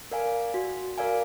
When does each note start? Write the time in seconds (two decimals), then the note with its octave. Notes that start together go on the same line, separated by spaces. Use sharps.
0.11 A#4 D5 F5 G#5
0.54 F#4
0.98 A#4 D5 F5 G#5